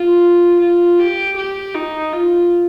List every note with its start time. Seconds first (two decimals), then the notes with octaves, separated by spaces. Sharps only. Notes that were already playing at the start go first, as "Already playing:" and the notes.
Already playing: F4
0.60 F4
0.99 G4
1.36 G4
1.75 D#4
2.13 F4